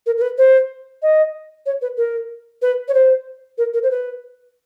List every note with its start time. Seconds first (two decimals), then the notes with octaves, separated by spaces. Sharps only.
0.06 A#4
0.17 A#4
0.21 B4
0.38 C5
1.02 D#5
1.66 C#5
1.82 B4
1.97 A#4
2.62 B4
2.88 C#5
2.94 C5
3.58 A#4
3.73 A#4
3.83 C5
3.91 B4